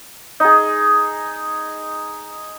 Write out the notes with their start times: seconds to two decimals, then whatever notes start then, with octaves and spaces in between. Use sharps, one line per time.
0.40 D#4 G#4